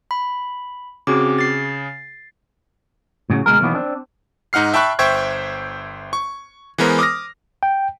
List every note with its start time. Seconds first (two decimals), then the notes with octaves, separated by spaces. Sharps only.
0.11 B5
1.07 C#3 C4 F#4 G#4 D6
1.38 A6 C7
3.30 A2 C#3 F#3
3.46 D2 B2 G#3 A#4
3.61 B2 D#3 E3 F#3 A#3 B3
3.75 C4 D4
4.53 G#2 D#4 F#5 F6 C7
4.74 E5 G5 A5 B5 C#6 F#6
4.99 G1 C5 E5 G5 C#6 G#6
6.13 C#6
6.78 E3 G#3 B3 A#4 C5
6.99 D6 D#6 F6 A#6
7.63 G5